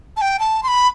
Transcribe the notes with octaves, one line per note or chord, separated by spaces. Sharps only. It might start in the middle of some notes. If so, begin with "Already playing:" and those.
A5
G5
A5
C6
B5